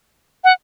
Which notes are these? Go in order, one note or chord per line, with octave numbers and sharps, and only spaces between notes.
F#5